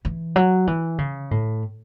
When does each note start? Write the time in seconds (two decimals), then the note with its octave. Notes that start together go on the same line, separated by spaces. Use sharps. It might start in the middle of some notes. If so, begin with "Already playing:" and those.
0.05 E3
0.36 F#3
0.67 E3
0.98 C#3
1.31 A2